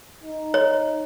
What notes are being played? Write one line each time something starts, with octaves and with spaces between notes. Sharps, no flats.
D#4
C#5